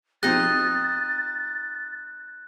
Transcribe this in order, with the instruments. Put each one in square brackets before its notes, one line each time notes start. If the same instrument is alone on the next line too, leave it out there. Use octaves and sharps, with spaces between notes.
[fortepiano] F3 C4 G4 [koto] D#4 D#5 [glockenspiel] F#6 [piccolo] A6